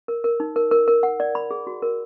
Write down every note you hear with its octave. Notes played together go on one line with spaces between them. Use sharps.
A#4
A#4
D#4
A#4
A#4
A#4
F#5
D5
B5
G#4
F#4
A#4